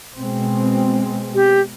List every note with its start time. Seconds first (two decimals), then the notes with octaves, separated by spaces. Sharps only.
0.16 B2 G#3 C4
1.35 G4